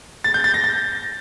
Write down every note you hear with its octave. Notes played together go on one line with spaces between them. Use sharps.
A6
G6
A6
A#6
A6